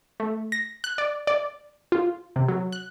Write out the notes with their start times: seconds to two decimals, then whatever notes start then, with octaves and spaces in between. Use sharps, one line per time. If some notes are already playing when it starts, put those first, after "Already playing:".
0.20 A3
0.52 A#6
0.84 F#6
0.98 D5
1.27 D5
1.92 F4
2.36 C3
2.49 F#3
2.72 F#6